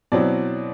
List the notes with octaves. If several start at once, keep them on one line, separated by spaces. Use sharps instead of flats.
B2 F#3 C4 E4 D5